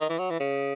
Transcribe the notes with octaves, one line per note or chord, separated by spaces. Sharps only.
D#3
E3
F#3
E3
C#3